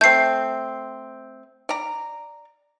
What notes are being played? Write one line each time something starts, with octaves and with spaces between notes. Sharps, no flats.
A3 C4 G6 C7
D5 A#5